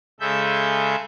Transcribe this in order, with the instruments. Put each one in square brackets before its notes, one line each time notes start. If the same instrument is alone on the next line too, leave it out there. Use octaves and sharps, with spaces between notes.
[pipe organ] C#3 G#3 A4 E5 G6